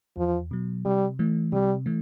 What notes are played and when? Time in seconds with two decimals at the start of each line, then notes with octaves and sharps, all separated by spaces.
0.17 E2 F3
0.51 B2 F#3
0.85 C3 G3
1.19 E3 A3
1.53 C3 G3
1.86 E3 A3